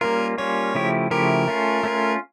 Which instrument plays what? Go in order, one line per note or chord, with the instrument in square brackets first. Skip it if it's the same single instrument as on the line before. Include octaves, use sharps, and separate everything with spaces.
[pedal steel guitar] G3 A#3 C#4 F4 [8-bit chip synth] A#4
[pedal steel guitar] G3 A#3 C#4 F4 [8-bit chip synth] C#5
[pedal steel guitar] C#3 F3 A3 E4 G4
[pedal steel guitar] C#3 F3 A3 E4 G4 [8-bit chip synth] A#4
[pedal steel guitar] A3 C#4 F4
A3 C#4 F4